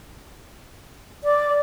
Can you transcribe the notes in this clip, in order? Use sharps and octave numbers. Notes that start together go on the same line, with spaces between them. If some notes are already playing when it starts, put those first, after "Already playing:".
D5